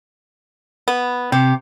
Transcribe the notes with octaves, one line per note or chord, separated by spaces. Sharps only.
B3
C3 G4